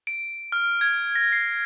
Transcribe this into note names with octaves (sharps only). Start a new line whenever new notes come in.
D7
F6
G#6
A#6
C7